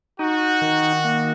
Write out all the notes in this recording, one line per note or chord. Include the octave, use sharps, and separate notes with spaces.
D#4 F#4
D#3
A#3